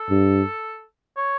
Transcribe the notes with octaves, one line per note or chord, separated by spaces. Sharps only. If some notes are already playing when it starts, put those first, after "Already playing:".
Already playing: A4
G2
C#5